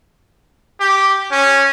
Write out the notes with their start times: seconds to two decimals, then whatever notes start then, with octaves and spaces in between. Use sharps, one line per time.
0.80 G4
1.32 C#4